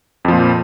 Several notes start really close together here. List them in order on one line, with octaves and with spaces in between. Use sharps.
F2 F3 A#2